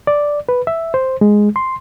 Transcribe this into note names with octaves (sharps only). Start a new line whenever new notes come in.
D5
B4
E5
C5
G#3
C6